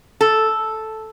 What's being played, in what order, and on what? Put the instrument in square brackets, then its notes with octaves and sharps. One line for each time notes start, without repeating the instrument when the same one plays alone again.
[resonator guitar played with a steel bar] A4